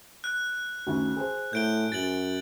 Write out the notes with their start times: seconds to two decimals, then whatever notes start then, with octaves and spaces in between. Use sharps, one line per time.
0.24 F#6
0.87 D2 D#3 C#4
1.16 G#4 C5
1.53 A2 G6 D7 G7
1.92 F#2 A6 F#7